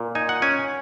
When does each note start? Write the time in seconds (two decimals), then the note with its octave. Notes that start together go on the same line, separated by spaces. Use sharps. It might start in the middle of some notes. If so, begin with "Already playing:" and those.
Already playing: A#2
0.15 D#4 G#5
0.29 F#5
0.42 C#4 G#5